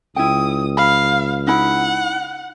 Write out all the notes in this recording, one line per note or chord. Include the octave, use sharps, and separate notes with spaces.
C#2 E4 G5 D#6
F5 B5
D#4 E4 F#5 B5